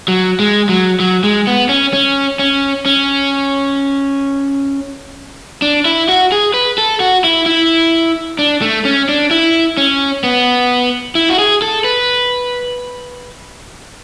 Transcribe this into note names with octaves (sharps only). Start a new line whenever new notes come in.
F#3
G#3
F#3
F#3
G#3
B3
C#4
C#4
C#4
C#4
D4
E4
F#4
G#4
B4
A4
F#4
E4
E4
D4
A3
C#4
D4
E4
C#4
B3
E4
F#4
G#4
A4
B4